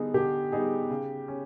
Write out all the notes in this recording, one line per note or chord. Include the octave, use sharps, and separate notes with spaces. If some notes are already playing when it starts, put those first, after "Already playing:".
Already playing: D3 G3 B3 D#4 G#4
D3 G4
G3 B3 D#4 G#4
C#3
C#4